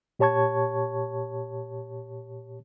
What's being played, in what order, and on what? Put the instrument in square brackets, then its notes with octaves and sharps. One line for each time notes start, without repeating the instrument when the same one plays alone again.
[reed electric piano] A#2 G4 C#5 A5 C#6 G#6